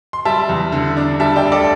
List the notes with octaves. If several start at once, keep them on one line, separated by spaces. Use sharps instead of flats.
C6
G3 E5 A5
E2
D3
D4
G3 E5 A5
D5 G5
D2
A4 D5